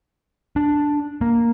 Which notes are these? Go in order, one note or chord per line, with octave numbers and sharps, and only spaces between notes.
D4
A#3